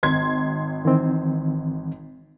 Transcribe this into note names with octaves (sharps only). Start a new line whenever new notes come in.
G#1 C6 G#6
D#3 E3 C4